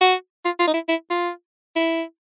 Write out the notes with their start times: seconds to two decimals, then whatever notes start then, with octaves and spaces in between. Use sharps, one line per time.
0.01 F#4
0.45 F4
0.60 F4
0.68 D#4
0.74 E4
0.88 E4
1.10 F4
1.76 E4